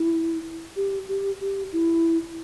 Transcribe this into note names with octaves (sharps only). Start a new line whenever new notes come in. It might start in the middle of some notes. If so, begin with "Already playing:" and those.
Already playing: E4
G4
G4
G4
E4